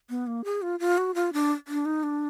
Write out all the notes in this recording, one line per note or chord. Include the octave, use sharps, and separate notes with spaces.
B3
A#3
G#4
F4
F4
F#4
F4
D4
D4
D#4
D4